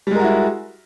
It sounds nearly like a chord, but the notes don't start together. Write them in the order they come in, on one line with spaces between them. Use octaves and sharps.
G3 G#3 A#4 F#4 E4